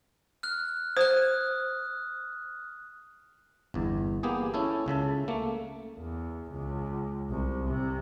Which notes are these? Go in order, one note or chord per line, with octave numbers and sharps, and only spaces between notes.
F6 F#6
C5 D#6 F#6
G1 E2
A#3 B3 G4 G#4
C#4 E4 A4
C#2 C#3 E5 A5
A3 A#3
E2
C#2
C2
C3